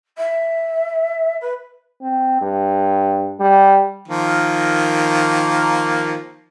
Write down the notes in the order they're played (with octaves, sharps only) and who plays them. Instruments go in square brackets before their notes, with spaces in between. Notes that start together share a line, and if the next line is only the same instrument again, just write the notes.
[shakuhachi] E5
B4
[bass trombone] C4
G2
G3
[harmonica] D#3 F3 A#3